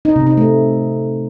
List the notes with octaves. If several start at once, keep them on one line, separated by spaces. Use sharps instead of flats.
D#4
C3
D#4
A3